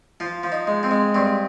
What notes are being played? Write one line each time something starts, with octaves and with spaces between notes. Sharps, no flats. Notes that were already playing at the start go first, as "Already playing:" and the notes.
F3 F4
F3
D#4
G#3
C4
G#3
G2 C4